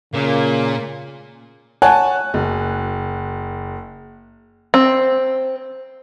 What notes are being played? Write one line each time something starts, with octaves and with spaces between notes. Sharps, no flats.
A#2 C#3 A#3
C#5 F#5 G#5 A5 F#6
F#1
C4